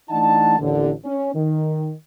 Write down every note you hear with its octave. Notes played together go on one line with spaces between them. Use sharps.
E3 A3 D4 D#4 F#5 A5
A1 D#2 D3
C#4
D#3